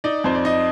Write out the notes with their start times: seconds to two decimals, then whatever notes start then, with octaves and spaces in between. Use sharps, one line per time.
0.04 D#4 D5
0.24 F2 C5
0.35 D5
0.45 D#4 D#5